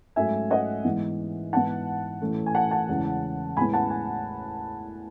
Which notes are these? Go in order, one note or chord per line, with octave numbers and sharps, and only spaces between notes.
G#2 F#3 A3 C#4 E5 G#5
D#5 F#5
G#2 E3 G#3 B3
G#2 E3 B3 F#5 A5
A2 E3 A3 C#4
G#5
F#5 A5
F#5 A5
E2 C#3 G#3 C#4
A2 G#3 B3 G#5 B5
F#5 A5
G#5